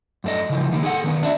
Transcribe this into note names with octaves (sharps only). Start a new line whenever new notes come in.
F#2 A3 D#5
C#3 E3 F3
D#3 A#3 D#4
G#4 A4 F#5
D#3 B3 C#4
D4 E5